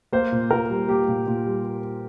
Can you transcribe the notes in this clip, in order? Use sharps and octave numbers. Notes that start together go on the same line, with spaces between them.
A#3 C5
A#2
A#2 A#4
G3
A#3 G4
A#2
A#2
G3